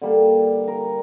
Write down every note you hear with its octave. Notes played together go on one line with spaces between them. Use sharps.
D3 G3 A#3 D4
A#4